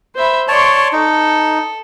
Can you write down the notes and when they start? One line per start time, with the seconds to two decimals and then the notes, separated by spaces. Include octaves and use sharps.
0.15 C5 E5 B5
0.48 C#5 D5 A5 C6 C#6
0.93 D#4 A4